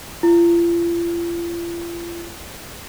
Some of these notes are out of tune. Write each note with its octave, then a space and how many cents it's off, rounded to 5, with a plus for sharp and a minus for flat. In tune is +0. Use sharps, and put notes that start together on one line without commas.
F4 -40